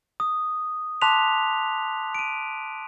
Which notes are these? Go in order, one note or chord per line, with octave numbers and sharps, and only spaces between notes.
D#6
A5 C6 D6 F#6 B6 F7
D7 D#7